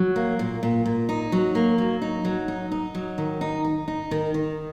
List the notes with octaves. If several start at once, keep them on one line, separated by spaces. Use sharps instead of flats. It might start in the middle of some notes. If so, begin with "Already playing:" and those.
Already playing: F#3
A#3
A#2
A#2
A#2
D#4
F#3
A#3
F#3
D#4
F#3
D#4
D#4
F#3
D#3
D#4
D#4
D#4
D#3
D#3